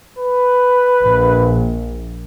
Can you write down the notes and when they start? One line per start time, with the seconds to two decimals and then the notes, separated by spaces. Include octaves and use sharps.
0.19 B4
1.02 A#1